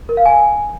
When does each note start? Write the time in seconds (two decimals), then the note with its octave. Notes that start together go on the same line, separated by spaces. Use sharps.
0.09 A#4
0.17 F5
0.26 G#5